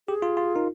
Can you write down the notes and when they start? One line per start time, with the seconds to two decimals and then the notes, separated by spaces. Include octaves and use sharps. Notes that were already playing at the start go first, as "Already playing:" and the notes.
0.08 G4 G#4
0.22 F4
0.37 F4
0.55 D#4 A#4